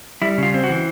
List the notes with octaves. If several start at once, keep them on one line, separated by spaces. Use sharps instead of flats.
G3 E4
C#3 F4
C4
F#4
E3